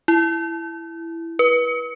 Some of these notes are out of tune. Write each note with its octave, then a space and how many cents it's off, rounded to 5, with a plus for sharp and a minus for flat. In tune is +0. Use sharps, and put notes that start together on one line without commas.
E4 +10
B4 -25